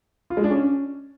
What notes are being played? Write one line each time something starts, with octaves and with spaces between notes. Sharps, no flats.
F4
G#3
D4
C#4